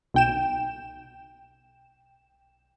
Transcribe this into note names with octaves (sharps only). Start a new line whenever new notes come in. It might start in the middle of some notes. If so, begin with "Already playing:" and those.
B1 G5 E7